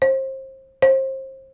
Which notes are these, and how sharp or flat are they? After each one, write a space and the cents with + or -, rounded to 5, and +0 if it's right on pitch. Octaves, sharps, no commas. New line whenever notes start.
C5 +30
C5 +30